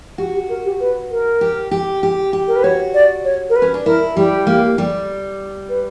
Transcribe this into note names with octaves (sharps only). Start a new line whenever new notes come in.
F#4 G4
G4
A#4
G4
B4
A#4
G4
G4
G4
G4
A#4
B4
F#4 C#5
D5
C#5
A#4
B4
C#4
D4
E4 A#4
G3 G4
A#3
G3
B4